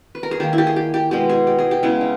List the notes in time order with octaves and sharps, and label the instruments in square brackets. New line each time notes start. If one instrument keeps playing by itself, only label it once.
[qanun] B4
A#4
G#4
D#3 A#3 G4
E4
G4
G#4
G4
G4
B2 G#3 B3 G4
G#4
G4
G#4
G4
C#3 G#3 B3 E4
D#4